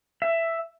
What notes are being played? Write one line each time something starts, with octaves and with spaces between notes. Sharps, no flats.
E5